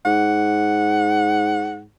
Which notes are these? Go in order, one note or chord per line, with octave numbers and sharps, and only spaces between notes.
G#2 F#5